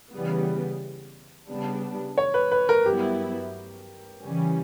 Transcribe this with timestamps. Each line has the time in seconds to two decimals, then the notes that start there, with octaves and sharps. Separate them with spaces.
0.13 C#3 E3 G3 B3
1.49 C#3 G3 B3 D4
2.18 C#5
2.34 B4
2.51 B4
2.69 A#4
2.86 G2 F#3 B3 E4 G4
4.22 C#3 E3 G3 C#4